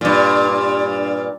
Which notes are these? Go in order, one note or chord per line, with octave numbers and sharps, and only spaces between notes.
G2 A#2